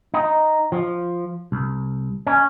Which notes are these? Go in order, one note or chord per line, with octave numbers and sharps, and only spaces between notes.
D#4
F3
C2
C#4